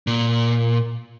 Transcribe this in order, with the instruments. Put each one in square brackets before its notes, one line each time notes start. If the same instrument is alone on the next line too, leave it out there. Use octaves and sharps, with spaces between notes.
[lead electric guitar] A#2